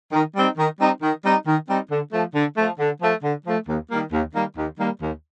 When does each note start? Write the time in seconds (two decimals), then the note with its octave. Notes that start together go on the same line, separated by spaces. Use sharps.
0.12 D#3
0.35 G3 C4 D#4
0.57 D#3
0.79 G3 C4 D#4
1.02 D#3
1.23 G3 C4 D#4
1.46 D#3
1.68 G3 C4 D#4
1.90 D3
2.13 F3 A3
2.35 D3
2.57 F3 A3
2.79 D3
3.01 F3 A3
3.23 D3
3.46 F3 A3
3.67 D#2
3.90 D#3 G3 A#3
4.12 D#2
4.34 D#3 G3 A#3
4.56 D#2
4.78 D#3 G3 A#3
5.01 D#2